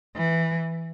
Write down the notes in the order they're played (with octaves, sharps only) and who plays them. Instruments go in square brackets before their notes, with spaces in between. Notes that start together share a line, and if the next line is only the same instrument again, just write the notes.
[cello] E3